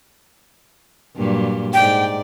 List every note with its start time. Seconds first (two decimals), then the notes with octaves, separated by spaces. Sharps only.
1.17 G2 A#2 F#3
1.74 G#2 D5 G5